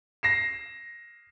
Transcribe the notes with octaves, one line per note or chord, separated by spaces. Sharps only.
A#6 C7 E7